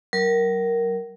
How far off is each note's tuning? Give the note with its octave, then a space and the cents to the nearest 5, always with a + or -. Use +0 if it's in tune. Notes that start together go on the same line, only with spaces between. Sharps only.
F#3 +45 A#4 +0